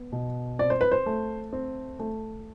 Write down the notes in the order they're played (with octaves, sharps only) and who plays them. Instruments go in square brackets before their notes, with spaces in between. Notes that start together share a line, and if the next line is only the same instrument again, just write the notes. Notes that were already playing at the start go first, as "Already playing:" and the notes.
Already playing: [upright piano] B3
B2
C4 D5
C5
B4
C5
A3
C4
A3